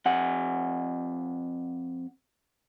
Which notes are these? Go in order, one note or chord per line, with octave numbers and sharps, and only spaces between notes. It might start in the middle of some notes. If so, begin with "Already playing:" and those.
F2 F#5